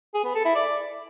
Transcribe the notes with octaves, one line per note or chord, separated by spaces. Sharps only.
G#4
B3
A4
E4
D5